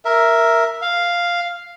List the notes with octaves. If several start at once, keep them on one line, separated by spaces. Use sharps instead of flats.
A#4 E5
F5